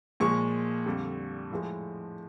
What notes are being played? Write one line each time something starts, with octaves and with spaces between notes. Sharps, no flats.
A#2 F3 G#3 C#6
F2 D3 G3
A2 F3 G#3